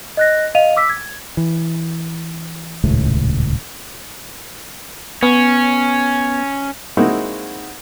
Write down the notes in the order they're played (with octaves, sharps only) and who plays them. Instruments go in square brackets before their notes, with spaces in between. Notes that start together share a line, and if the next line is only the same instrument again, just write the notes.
[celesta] D#5 F#6 A#6
D#5 F5 D#7 F7
D6 E6 B6
G#6
[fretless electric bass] E3
D#1 C#2 A2
[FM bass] B3 [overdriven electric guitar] C#4
[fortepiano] G#3 A#3 C4 D#4 E4 F#4